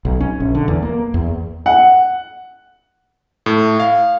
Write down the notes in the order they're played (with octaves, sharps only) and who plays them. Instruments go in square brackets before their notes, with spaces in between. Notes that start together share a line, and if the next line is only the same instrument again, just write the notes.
[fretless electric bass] B1
C#4
A#1
D3
E2
A#3
E2
[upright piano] F#5
[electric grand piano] A2
F5